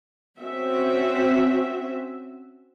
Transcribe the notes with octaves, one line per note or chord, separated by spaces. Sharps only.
C4 C#4 F#4 E5